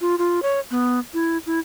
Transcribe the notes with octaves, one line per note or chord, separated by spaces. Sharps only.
F4
F4
C#5
B3
E4
E4